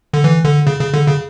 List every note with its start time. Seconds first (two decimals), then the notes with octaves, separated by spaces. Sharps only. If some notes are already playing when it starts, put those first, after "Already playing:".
0.14 D3
0.24 E3
0.45 D3
0.67 C#3
0.80 C#3
0.94 D3
1.08 C#3